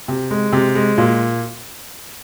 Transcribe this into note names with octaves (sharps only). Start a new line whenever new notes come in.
C3
G#3
C3
G#3
A#2